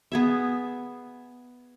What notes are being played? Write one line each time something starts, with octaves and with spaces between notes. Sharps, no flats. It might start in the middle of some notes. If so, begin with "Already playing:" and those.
B3 G#4 E5